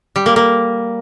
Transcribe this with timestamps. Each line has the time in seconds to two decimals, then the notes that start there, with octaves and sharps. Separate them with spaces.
0.16 G3
0.26 A#3
0.36 A#3